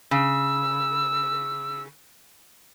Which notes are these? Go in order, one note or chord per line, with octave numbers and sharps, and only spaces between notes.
C#3 E6